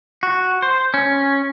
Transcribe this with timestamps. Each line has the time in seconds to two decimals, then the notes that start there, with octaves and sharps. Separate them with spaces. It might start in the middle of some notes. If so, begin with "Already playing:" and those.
0.23 F#4
0.62 C5
0.94 C#4